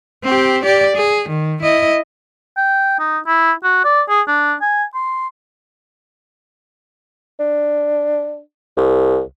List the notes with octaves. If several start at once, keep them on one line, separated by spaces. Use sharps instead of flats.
C4 G4
G4 D5
G#4
D#3
E4 D#5
G5
D#4
E4
F#4
D5
G#4
D4
G#5
C6
D4
C2